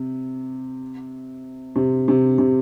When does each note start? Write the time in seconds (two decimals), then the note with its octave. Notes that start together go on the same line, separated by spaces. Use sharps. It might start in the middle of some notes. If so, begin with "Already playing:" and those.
Already playing: C3
1.76 C3
2.08 C3
2.38 C3